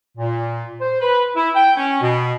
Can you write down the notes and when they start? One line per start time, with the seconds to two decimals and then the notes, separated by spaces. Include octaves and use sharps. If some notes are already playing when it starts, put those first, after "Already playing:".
0.17 A#2
0.81 C5
1.01 B4
1.35 E4
1.55 G5
1.76 C#4
2.01 B2